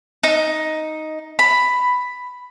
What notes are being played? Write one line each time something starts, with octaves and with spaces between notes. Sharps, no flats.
D#4
B5